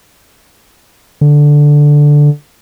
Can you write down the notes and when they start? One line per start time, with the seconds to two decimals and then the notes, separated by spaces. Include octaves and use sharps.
1.21 D3